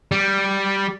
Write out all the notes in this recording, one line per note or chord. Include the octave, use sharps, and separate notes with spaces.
G3